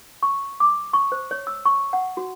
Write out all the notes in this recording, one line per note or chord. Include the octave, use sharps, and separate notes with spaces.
C#6
D6
C#6
C5
C#5
E6
C#6
F#5
F#4